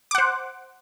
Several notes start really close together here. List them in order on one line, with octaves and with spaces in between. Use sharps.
D6 F#5 C5